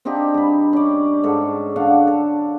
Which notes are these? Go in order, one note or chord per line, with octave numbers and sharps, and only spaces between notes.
C4 D4 D#4 G4
G2 B5
C#4 D5
G#2 A4
D3 D4 F5 F#5
A4